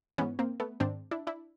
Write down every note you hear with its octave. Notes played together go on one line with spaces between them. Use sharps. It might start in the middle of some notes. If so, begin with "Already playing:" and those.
G#2 E3 B3 C#4
A#3 C4
A3 B3
G#2 D#3 C4 D4
D4 E4
D4 E4